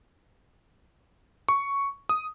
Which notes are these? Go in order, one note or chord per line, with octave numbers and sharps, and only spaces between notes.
C#6
D#6